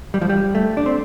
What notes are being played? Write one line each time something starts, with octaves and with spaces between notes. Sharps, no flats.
G3
F3
G3
A3
D4
C4